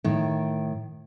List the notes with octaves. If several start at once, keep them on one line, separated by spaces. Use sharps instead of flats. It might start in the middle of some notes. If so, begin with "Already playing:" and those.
A2 D#3